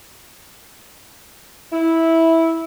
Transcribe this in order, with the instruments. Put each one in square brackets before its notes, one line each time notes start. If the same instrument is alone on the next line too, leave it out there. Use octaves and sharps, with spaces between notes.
[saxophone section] E4